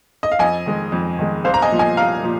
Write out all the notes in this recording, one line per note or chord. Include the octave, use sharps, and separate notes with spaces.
D#5
F5
F2 D#5 G#5
D#3 G#3
F2
D#3 G#3
C2 C5 F5
A#5
D#5 G#5
A#2 F3
D#5 G#5
C2 F5 A#5
A#2 F3